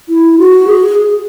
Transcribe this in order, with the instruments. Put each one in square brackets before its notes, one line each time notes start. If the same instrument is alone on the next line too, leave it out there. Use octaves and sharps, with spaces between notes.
[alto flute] E4
F#4
G#4